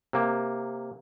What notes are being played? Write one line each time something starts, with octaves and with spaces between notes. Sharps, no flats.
C3 A#3